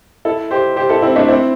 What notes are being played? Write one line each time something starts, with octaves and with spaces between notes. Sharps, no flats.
E4 A4
G4 C5
G4 C5
E4 A4
C4 E4
A3 D4
C4 E4